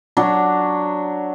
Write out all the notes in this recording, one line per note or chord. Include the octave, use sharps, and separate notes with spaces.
F#3 D4